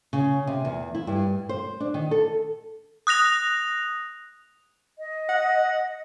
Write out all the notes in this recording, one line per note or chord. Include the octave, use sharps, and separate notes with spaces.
C#3
C3
E2
E4
G2
C5
D4
D#3
A4
D#6 F#6 A#6 F7
D#5
F#5